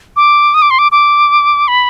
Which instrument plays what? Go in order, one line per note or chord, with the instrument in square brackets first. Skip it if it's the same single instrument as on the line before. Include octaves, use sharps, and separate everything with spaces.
[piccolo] D6
D#6
D6
C6
D6
D6
B5